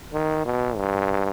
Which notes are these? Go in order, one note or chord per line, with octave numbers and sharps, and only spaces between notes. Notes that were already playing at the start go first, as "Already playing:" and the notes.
D#3
B2
G2